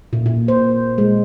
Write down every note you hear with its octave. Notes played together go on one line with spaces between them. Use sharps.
A#2
A#2
C5
G#3